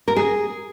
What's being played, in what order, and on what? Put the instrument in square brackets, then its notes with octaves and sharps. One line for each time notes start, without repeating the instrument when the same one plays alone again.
[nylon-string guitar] A#4
G#4